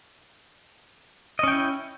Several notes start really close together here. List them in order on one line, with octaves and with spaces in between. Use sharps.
D#5 C#4 G5 E4